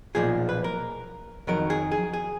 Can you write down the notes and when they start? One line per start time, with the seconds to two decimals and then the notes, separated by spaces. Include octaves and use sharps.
0.15 B1 A#2 F3 G#4
0.49 B4
0.64 A#4
1.47 F2 D#3 F#3 A#4
1.70 G#4
1.92 G#4
2.13 G#4